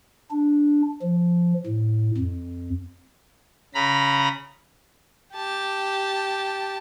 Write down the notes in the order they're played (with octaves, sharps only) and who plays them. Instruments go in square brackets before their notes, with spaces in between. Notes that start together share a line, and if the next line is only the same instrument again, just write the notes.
[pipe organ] D4
F3
A2
F2
C#3 A#5 B5
[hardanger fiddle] G4 A5